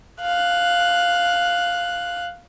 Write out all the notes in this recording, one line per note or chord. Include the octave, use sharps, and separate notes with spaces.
F5 F#6